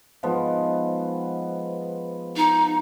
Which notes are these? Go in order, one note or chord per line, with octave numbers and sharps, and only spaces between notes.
G#2 F3 B3
D#4